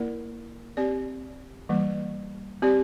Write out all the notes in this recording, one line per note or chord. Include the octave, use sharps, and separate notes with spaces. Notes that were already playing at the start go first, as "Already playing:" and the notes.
Already playing: A#3 E4 A#4 D5
C4 G4 D5
E3 G3 A#3
C4 G4 D5